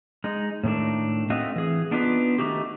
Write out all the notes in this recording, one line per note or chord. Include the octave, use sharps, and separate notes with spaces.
G#3 D#4
A2 D#3 A3 D4
A3 C4 F#4 D#5 F5
E3 G#4
B3 D4 D#4 F4 B4
D#3 A3 D#4 F#4 G4